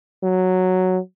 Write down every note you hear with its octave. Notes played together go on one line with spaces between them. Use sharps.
F#3